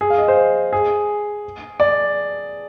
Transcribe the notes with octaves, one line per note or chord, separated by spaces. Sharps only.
G#4
F5
D#5
C5
G#4
D5